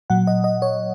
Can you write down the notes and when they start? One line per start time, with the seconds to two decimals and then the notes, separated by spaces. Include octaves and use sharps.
0.10 A#2 F#3 F#5
0.27 D#5
0.44 D#5
0.62 C#5